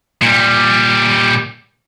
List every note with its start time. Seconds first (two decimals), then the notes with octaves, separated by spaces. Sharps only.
0.22 A#2 G3